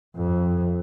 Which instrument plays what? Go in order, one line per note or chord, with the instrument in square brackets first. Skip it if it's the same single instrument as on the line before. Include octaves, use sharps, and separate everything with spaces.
[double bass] F2